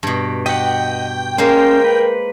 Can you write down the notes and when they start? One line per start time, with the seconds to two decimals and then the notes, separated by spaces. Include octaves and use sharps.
0.03 G2 B2
0.46 G4 D#5 F#5 G5
1.38 G#3 A#3 C#4 A#4 C5
1.84 B4